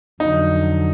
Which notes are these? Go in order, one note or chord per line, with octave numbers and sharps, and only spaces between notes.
F2 D3 F#3 D#4